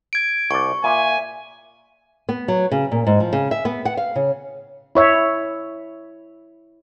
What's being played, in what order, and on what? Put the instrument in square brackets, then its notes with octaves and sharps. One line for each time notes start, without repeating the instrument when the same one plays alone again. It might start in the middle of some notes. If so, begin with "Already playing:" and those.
[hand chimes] G#6 D7
[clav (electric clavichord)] C2 D5 [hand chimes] C#6
[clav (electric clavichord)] A#2 [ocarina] E5 [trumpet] G#5
[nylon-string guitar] B3
F#3
C#3
A#2
G#2
F3
C#3
E5
B3
F#5
F5
C#3
[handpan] E4 C#5 E5